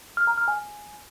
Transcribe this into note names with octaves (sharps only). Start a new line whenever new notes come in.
F6
A#5
F6
G#5